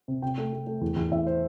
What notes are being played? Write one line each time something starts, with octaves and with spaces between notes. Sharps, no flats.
C3
C3 G5
A3
A3
A3
E2
E2
E2 E5
C5